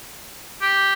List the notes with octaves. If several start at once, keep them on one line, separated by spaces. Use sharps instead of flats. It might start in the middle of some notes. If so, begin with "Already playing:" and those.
G4